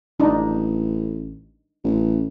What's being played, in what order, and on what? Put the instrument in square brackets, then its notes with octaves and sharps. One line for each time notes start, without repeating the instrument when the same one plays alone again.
[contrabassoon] A1 [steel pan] D4 D#4
[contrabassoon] A1